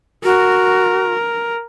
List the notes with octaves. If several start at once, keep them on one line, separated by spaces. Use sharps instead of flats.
F#4 A#4